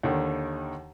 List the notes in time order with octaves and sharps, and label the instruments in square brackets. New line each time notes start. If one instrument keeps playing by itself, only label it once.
[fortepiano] D#2 D3 D#3